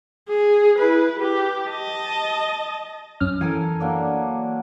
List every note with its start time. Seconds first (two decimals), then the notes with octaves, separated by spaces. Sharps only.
0.28 G#4
0.78 E4 B4
1.20 G4
1.66 D#5 A5
3.20 F#2 C#4 F6
3.41 E3 A4 A#4 G#5
3.80 F#3 A#3 D4